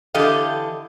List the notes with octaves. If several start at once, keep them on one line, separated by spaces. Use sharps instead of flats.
D3 E3 G4 A4 D#5 F5